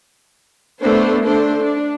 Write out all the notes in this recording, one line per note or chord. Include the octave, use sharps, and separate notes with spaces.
A3 B3 D4 C5
D3 A3 D4 C5
D4